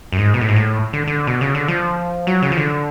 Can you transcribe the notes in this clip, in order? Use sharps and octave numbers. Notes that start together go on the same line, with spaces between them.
F#2
G#2
B2
A2
G#2
A2
D3
D3
B2
C#3
D3
F3
F#3
C#3
F3
D3